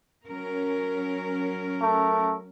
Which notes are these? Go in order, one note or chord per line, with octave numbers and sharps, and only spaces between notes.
F#3 C#4 A#4
A3